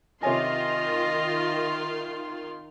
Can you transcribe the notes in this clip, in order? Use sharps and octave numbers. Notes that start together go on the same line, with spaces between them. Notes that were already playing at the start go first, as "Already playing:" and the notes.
C3 D#3 F4 C#5 D#5 G#5 C6